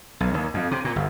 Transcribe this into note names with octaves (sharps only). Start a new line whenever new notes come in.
B1
D#2
F2
C3
A#2
G1